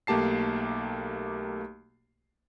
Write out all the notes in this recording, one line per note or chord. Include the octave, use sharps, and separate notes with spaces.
B1 A3 A#3 G4 A5 C7